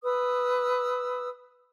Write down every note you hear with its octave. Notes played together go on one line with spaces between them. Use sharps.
B4 D#6 E6